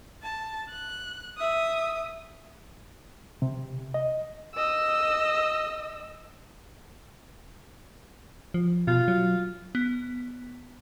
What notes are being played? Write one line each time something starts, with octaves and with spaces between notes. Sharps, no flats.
A5
F#6
E5 D#6
C3
D#5
D#5 E6
F3
B2 F4
F#3
B3